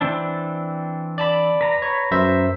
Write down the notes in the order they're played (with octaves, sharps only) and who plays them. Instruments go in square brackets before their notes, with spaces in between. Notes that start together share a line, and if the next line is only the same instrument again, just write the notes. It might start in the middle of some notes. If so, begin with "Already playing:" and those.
[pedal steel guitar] E3 C4 D4
[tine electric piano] D5 A5 B5
[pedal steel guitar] B4 A#5
[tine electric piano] C#5
F#2 C5 E5